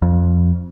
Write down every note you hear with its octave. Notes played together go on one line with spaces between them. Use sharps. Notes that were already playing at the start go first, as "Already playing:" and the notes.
F2